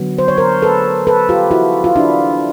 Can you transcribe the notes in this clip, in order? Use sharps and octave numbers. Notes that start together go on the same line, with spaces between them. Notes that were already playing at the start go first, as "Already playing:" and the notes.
Already playing: D3 F#3 B3
C5
C#5
A#4 C5
A4 B4
A4 B4
F4 G4
E4 F#4
F4
D4 E4